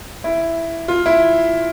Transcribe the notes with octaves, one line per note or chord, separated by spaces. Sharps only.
E4
F4
E4